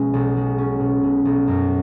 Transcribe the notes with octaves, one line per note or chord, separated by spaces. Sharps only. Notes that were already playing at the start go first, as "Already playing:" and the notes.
Already playing: B2 G#3 C#4
B1
G#3
C#4
B2
B2
B1
F#2